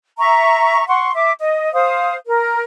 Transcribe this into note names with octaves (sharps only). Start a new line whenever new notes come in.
E5 A#5 C#6
F#5 C6 C#6
E5 D6
D#5
C5 F5 D#6
A#4